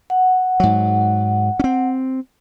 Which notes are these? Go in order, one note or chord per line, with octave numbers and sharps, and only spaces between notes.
F#5
G#2 F#3
C4 C#4